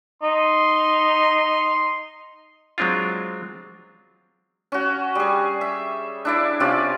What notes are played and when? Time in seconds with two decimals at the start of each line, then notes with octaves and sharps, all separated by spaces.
0.22 D#4 C6
2.78 F#3 G#3 C4 D4 F4
4.72 C#4 F#4
5.15 G3 G#4
5.61 E5
6.25 D4 E4 D5
6.60 C3 C#4 F4 D5